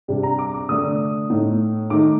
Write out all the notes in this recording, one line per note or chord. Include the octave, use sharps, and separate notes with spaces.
C3 G3 D4
A#5
D6
D6
D3 A3 D4 D#6
A2 A3 D#4
D#3 A3 D#4 D6